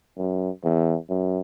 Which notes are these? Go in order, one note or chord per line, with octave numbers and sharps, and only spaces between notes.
F#2
E2
F#2